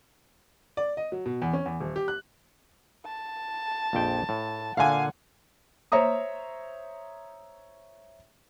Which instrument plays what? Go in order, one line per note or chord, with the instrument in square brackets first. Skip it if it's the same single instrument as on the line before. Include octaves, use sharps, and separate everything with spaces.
[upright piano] D5
D#5
F#3
B2
E2
C#4
E2
D#1
G4
F#6
[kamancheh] A5
[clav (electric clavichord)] A#1 F2 G5
A2
[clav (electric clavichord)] A#2 D3 [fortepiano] F5 G#5 [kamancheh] F#5
[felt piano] C5 C#5 E5 A#5 D#6